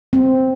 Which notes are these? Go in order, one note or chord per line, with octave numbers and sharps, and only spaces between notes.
C4